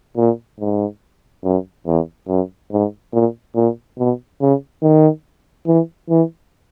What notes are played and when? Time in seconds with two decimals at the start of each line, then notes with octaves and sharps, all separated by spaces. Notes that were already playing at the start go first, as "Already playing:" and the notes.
0.17 A#2
0.60 G#2
1.44 F#2
1.87 E2
2.28 F#2
2.72 G#2
3.13 A#2
3.55 A#2
3.99 B2
4.41 C#3
4.82 D#3
5.67 E3
6.10 E3